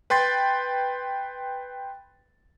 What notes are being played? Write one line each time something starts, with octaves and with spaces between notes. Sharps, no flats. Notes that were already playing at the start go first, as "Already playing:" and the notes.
B4 G5 C6 A6